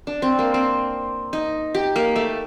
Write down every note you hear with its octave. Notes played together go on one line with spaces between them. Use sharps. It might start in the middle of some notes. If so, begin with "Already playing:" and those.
D4
C4
A#3
C4
D#4
G4
A#3
A3